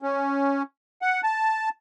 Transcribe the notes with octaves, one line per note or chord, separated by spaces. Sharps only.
C#4
F#5
A5